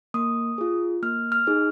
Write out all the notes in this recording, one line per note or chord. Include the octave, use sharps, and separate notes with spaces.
A#3 D#6
F4 G#4
A#3 F6
F6
D#4 G#4